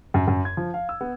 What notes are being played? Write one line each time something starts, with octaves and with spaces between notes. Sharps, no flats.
F#2
F#2
G#6
F3
F5
E6
B3